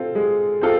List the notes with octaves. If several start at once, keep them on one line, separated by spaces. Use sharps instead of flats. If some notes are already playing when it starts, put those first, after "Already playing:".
Already playing: C4 F4 A4
G#3
C4 F4 A4